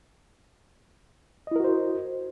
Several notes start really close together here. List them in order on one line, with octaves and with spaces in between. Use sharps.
D#5 E4 A#4 F#4 C5